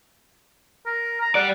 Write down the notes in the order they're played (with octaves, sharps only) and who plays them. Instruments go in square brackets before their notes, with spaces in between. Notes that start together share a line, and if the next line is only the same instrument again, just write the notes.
[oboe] A#4
A#5
[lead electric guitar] G3 D5 [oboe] F#5